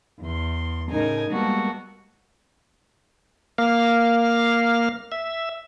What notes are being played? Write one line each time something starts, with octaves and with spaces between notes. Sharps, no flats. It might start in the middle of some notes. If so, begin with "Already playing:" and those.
E2 C6
A2 C#3 D#4 A#4 G#5
G3 G#3 A#3 B3 F#4 A4
A#3 F5
E5